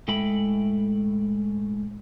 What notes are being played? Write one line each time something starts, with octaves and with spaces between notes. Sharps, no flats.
A2 G#3 A4 E5 G5 B5